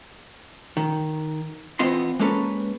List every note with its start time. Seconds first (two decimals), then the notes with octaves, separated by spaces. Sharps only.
0.77 D#3
1.79 E2 B3 C4 F4 D#5 C6
2.19 G#3 A#3 C#4 A4 B4